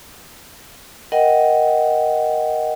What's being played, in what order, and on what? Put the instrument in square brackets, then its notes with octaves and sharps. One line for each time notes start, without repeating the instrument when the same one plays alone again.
[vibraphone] A#4 D#5 F#5 G5